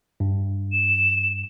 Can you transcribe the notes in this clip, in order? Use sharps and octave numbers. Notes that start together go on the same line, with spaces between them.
G2
E7